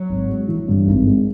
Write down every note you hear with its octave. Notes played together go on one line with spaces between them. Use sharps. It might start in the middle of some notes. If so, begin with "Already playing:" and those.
Already playing: F#3
G#1
G#3
E3
G2
G#1
G#3